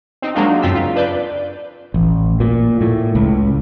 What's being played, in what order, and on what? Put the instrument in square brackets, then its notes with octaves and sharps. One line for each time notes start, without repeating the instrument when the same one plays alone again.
[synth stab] C4 D#4
F#3 G#3 A#3 D4 D#4 F4
F#2 C#3 C4 F4 E6 B6
F4
D4 B4 D5 G6
[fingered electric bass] A1
A#2
A2
C#2